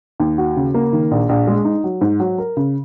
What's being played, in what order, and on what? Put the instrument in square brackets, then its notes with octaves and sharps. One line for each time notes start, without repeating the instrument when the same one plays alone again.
[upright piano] D#2
F#4
C#3
A#3
D#3
A#1
A#1
G#3
D#4
F#3
G#2
F#3
A#4
C#3